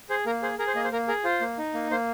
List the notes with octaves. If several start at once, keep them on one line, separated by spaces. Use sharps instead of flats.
G#4 C5
A#3 A#4
G#4 C5
G#4 A#4
C5
A#3 D#5
C5
A#3 A#4
G#4 A#4
F4 C5
A#3
D#4
A#3
A#3 C5